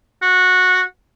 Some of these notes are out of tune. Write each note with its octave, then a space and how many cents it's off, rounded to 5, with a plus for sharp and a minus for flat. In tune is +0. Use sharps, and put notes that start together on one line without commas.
F#4 -10